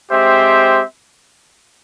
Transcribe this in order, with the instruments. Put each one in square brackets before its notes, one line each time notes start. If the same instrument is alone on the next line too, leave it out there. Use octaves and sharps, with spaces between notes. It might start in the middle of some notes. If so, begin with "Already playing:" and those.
[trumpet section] G#3 C4 G4 C5 E5